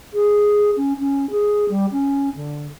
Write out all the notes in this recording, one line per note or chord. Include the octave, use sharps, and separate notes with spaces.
G#4
C#4
C#4
G#4
G3
C#4
D3